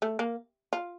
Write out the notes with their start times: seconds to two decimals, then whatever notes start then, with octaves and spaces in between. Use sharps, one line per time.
0.02 A3
0.19 A#3
0.73 F4